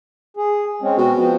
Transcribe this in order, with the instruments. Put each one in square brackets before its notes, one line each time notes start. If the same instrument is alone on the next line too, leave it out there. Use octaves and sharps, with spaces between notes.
[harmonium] G#4
G#3 C4 C#4
[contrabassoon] B2 [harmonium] C4 F#4
[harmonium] F3 B3 C4